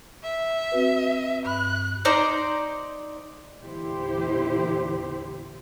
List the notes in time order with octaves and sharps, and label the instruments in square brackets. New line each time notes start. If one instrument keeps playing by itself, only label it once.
[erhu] E5
[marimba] C4 F#4 B4
[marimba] G2 B5 [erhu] F#6
[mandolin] D#4 C5 D5 A#5
[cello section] E2 A#2 D3 E4 G4 C5